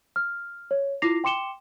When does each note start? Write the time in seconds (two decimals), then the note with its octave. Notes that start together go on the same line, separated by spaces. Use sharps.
0.16 F6
0.71 C#5
1.02 E4 F4 D6 A#6 C7 F7
1.24 G5 C6 D6 C#7 E7 G7